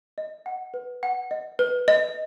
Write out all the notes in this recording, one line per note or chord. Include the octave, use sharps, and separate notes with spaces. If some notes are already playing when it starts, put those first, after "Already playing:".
D#5
F#5
B4
F#5
D#5
B4
D#5